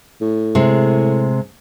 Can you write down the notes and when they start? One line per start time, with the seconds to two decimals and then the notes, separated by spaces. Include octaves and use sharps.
0.21 A2
0.55 C3 G#3